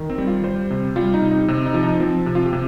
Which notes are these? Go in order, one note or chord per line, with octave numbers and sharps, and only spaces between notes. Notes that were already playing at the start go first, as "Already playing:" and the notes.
Already playing: D#3
C4
G3
F4
G3 C5
C3
G3 F4
D#4
C3
D#4
C3 C4
D#4
F3
D#4
F3 C4
C3
F4
G4
C3